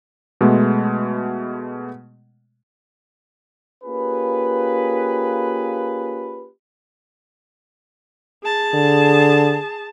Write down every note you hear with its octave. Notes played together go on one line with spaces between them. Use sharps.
B2 G#3 A3 B3
A#3 C#4 F4 G4 G#4 B4
G#4 A5
D3